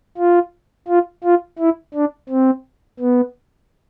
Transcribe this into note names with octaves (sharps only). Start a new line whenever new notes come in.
F4
F4
F4
E4
D4
C4
B3